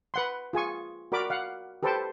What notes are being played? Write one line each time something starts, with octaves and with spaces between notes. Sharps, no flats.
B4 F#5 C6
F4 G#4 G#5 C#6
F#4 A#4 D5 B5 D6
F5 F#5
G4 A4 B4 C5 G5 A5